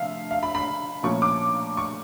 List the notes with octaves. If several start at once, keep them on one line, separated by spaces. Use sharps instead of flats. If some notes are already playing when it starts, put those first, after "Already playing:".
Already playing: C3 F3 A3 E5 F5
F5
B5
B5
A#2 F3 A3 C#4 C#6
D6
C#6